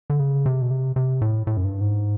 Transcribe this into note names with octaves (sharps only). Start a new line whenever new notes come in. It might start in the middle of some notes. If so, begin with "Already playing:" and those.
D3
C#3
C3
B2
C3
C3
A2
A2
F#2
G2
G#2